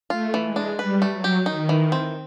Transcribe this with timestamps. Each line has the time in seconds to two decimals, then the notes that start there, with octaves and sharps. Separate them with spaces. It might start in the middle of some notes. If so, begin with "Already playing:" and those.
0.10 A3 F4
0.34 E3
0.45 G#3
0.56 D4
0.79 G3 B4
1.02 A3
1.13 F#3
1.24 G4
1.46 D#3 D#4
1.69 E3
1.92 C4